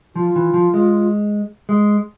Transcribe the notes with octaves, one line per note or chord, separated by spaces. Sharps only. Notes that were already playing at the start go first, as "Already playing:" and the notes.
F3 F4
E3
F3
G#3
G#3